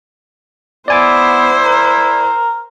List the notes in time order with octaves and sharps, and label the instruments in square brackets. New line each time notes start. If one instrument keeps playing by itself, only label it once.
[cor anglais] B3 [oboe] E4 [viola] C5 [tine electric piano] D5 G#5 D6
[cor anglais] A#4